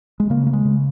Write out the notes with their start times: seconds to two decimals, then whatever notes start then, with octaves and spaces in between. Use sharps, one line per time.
0.20 G#3
0.30 C#3 A#3
0.47 A#3
0.53 G#3
0.65 C#3